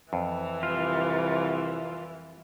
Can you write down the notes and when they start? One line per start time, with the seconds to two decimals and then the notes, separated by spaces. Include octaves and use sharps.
0.13 F2 E3
0.63 C2 F4